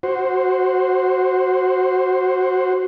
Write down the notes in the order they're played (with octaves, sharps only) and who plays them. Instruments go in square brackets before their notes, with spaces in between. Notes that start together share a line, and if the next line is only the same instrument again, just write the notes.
[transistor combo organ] F#4 C5